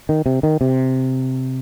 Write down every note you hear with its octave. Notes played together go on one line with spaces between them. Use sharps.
D#3
C3
D#3
C3